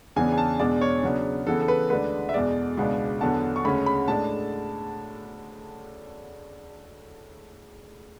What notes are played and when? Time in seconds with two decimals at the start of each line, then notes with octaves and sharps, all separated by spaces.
0.16 E2 C#3 E3 B3 D4 G#5
0.33 G#5
0.38 A5
0.60 E2 B2 G#3 B3 D4 D5
0.81 C#5
1.03 C#3 F#3 B3 D4
1.47 C#3 E3 B3 A4
1.61 A4
1.68 B4
1.90 D2 D3 G#3 D4 B4
2.29 E5
2.33 E2 B2 G#3 D5
2.77 C#2 B2 G#3 B3 D4
3.21 E2 D3 F#3 B3 A5
3.56 C#6
3.65 D2 C#3 G#3 C#4 B5
3.86 B5
4.08 A2 G#3 D4 A5